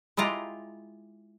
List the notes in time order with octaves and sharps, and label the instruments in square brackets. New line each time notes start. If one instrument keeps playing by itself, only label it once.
[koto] G#3 E4 F4 G4 A#5